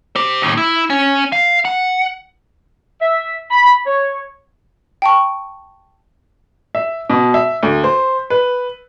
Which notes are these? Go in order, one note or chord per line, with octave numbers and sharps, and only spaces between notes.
G4 C5
D#2 A2
E4
C#4
F5
F#5
E5
B5
C#5
G5 A5 C#6
E5
B2
E5
D2
C5
B4